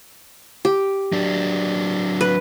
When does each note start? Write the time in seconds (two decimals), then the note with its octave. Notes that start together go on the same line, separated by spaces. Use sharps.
0.65 G4
1.12 F#3 D4
2.21 B4